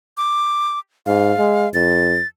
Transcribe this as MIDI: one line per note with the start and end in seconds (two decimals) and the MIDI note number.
0.17 0.79 86
1.06 1.33 44
1.06 1.69 77
1.38 1.67 56
1.74 2.18 41
1.74 2.27 93